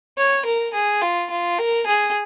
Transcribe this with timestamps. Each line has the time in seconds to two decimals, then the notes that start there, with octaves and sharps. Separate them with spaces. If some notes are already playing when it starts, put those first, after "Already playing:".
0.18 C#5
0.45 A#4
0.74 G#4
1.02 F4
1.30 F4
1.59 A#4
1.87 G#4